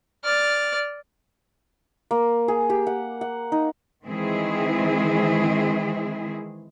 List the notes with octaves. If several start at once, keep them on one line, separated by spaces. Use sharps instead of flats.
D5 F6
A#3
G#4
G4
F#5
F#5
D#4
D#3 E3 G#3 C4 E4 G#4